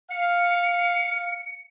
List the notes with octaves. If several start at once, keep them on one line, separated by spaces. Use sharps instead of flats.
F5 C#7